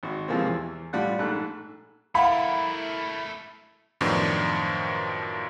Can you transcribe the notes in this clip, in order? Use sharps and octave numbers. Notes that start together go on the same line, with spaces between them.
G#1 F#4
C3 E3 F3 G#3 A#3 C4
E2 E3
A2 G3 F4 F#5 A5 F#6
A#1 G#2 A3 F#6
A3 E4 A#4 F5 F#5 B5
F#2 A2 D#3 F3 B3 D4